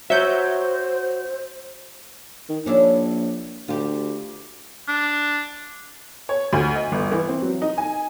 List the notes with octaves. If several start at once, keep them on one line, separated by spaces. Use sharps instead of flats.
F#4 C5 C#5 E5 G6
D#3
A#1 C#4 D4 E4
D2 F4 G4
D4
C#5
D2
D#5
G1
E3
C4
F#3
D#4
G#5